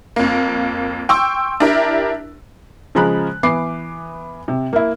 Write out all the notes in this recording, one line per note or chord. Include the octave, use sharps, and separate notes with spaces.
F2 A#3
G5 C6 C#6 E6
D4 E4 G4 A#4
C#3 F3 G#3 A#5 B5 F#6
E3 B3 D6 C7
C3
A#3 E4